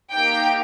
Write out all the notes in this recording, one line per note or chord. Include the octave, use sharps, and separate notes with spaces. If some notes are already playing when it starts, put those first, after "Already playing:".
A#3 D#4 G4 G5